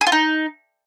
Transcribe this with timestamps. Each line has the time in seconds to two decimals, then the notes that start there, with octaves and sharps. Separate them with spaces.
0.01 G#4
0.07 F4
0.12 D#4